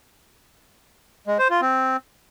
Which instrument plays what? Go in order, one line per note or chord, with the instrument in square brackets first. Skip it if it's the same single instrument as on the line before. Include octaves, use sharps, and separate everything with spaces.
[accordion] G#3
C5
F4
C4